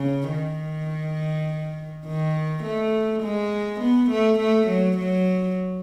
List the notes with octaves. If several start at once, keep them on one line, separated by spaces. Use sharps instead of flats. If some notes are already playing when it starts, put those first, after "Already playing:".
Already playing: C#3
D#3
D#3
A3
G#3
B3
A3
A3
F#3
F#3